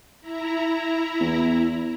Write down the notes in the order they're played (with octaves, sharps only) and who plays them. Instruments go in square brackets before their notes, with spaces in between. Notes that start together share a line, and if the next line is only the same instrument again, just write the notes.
[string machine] E4 A#5
[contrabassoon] E2